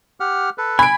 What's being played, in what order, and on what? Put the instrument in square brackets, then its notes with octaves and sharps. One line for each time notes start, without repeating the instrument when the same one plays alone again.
[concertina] G4 F#5 F6
A4 B4
[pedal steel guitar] G#5 [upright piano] B5 D7